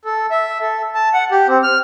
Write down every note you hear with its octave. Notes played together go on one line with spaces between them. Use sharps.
A4
E5
A4
A5
F#5
G4
C4
F6